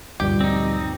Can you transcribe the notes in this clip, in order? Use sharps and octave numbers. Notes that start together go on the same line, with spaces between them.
D2 G2 A#2 F3 G3 G4
C4 D#4